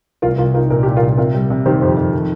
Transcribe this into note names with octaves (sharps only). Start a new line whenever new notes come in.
C2 F4 A#4
C2 F4 A#4
D#4 F4 A#4
A#2 A#4
A#2 G4
F4 A#4
C2
C3 F4 A#4
G3
C3
D#3 G4 C5
F2
F2
D#3